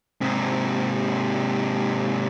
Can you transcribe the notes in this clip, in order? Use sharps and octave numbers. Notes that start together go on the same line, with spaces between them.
G#2 C3